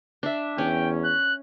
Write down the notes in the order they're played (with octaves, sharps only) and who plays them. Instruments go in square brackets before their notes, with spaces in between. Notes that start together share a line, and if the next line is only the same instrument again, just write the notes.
[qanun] D4 E5
[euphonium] E2 [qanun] C#4 [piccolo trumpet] G5
[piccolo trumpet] F#6